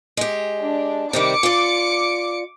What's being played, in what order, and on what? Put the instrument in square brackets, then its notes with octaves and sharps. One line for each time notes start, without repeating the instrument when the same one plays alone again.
[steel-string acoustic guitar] G#3 G4
[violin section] D4
[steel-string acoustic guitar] C3 D#3 G3 [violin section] D6 C#7
[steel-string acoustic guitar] F4 D5